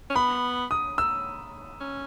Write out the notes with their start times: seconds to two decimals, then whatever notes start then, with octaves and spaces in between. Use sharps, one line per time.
0.10 C#4
0.16 B3 B5
0.71 D#6
0.98 E6
1.80 C#4